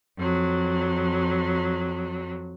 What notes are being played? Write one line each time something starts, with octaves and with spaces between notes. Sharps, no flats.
F2 F#3